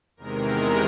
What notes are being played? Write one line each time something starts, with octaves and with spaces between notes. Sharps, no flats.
E2 C3 D#3 G#3 A#4